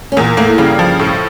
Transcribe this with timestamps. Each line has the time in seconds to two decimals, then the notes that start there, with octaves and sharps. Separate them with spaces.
0.12 C#4
0.17 E2 A#2 A#3
0.37 A2 A3 A#3
0.58 G2 C#3 G3
0.79 F3
0.99 A2